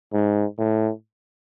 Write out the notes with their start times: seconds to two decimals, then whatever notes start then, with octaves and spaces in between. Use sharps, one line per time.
0.13 G#2
0.58 A2